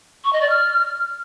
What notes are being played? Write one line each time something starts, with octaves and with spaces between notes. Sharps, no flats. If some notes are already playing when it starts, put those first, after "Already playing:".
C#6
D#5
D5
F6